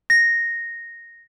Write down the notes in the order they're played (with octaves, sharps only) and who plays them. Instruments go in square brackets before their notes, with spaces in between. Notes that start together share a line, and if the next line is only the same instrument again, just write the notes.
[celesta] A#6